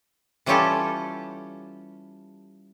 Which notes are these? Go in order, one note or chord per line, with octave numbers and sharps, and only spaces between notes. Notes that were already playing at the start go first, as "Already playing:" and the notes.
E3 G3 C#4 F4 G4 A4